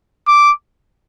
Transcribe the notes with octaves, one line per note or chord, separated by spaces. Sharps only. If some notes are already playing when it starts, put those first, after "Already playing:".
D6